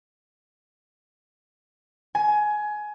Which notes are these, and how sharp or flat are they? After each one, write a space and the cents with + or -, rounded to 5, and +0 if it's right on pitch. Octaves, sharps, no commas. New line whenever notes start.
G#5 +20